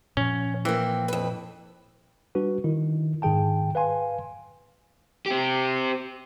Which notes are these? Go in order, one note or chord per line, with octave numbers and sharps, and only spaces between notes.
A#2 F3 C#4
E3 A#3 C4
F2 B4
G3 D4 F#4 B4
D#3 E4
G#2 D#3 G#4 G5 A5
B4 F5 G#5 C6
C4 G4